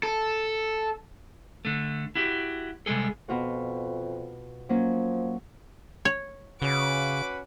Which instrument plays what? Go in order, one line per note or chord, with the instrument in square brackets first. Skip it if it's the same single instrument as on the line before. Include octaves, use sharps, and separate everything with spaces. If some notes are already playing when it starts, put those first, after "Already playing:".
[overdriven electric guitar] A4
[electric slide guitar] D3 A3
E4 F#4 G4
C3 G3 G#3 G#4 A4
[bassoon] F2 [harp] B2 F4 F#4
[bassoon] F3 [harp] F#3 A#3 C#4
[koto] C#5
[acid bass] C#3 [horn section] C#4 F#4 B4 [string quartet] D6